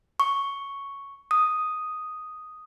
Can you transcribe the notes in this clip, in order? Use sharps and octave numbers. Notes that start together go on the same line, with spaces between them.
C#6
D#6